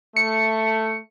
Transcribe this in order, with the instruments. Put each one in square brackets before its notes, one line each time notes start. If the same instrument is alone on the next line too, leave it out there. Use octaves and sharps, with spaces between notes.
[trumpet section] A3 [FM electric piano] C#7